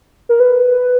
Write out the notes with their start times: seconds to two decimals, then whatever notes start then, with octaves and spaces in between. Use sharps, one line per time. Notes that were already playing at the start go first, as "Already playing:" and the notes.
0.29 A#4
0.40 B4